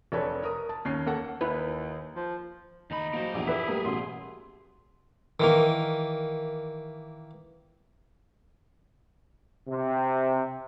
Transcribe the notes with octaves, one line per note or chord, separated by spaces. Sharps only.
F1 D4 A4 B4 C#5
A#4 D#6
A5
D#2 C#4 C7
A#3 A4 F#5
D#2 E4 B4
F3
D#2 D#4 B5
F#3 A#3 C5
A#1 E2 G4 G#4
E4 B4 B6
G3 A3 A#3
A1 B2 C6
D#3 E3 A#3
C3